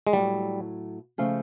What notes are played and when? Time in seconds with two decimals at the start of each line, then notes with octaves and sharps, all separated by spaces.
0.07 G#3
0.13 A2 F#3 G3 A3
1.18 C#3 F3 A3